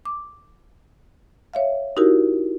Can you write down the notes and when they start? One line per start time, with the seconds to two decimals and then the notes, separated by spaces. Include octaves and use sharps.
0.05 D6
1.54 C#5 E5 F5
1.97 D#4 E4 F#4 G4 A#4